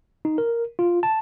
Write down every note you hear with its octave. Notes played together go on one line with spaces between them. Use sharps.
D#4
A#4
F4
A5